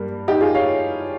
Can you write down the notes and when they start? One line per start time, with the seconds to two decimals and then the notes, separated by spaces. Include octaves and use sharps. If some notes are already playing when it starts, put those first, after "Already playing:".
Already playing: G2 G3 A#3
0.28 D#4 G4
0.41 F4 G#4
0.54 C#5 F5